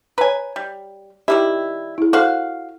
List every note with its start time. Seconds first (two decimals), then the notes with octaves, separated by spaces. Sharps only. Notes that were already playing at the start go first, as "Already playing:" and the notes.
0.18 B4 C#5 G#5 A#5
0.56 G3
1.28 D#3 G3 E4 G4
1.98 E4 G#4
2.13 F#4 A4 C5 F5